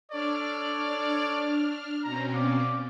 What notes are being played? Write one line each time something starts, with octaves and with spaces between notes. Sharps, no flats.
D4 A4 C#5 D5 F6
B2 C4 C#4 A#5
D5 F5 D6